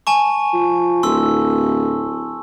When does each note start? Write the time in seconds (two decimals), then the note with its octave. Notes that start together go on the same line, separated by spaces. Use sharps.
0.07 G#5 A5 C#6
0.53 F3
1.03 D1 C6 E6